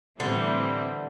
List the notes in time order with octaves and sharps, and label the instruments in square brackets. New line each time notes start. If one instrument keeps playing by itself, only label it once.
[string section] A2 E3 G3 C4 [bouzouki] D3